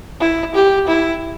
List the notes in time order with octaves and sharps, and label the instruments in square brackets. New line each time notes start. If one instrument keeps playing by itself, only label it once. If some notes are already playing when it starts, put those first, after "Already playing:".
[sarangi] E4
G4
E4